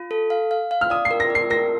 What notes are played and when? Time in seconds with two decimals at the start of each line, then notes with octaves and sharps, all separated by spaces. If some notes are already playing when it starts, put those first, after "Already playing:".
Already playing: F4
0.11 A4
0.30 F5
0.51 F5
0.71 F5
0.81 F6
0.90 D5 D#6
1.05 C7
1.11 A#4
1.20 A#6
1.30 D5 C7
1.50 A#4 A#6